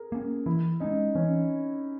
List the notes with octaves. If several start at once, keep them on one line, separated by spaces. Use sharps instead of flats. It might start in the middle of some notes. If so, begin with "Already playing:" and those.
Already playing: G#4 A#4
A#3 C#4
E3 E4
G#3 C#4 D#4
E3 C#4